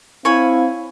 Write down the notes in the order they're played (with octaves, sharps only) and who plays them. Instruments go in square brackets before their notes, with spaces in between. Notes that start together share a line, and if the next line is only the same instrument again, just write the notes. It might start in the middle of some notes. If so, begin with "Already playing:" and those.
[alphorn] C4 [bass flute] E4 [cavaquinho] C#5 G#5 B5 [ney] F5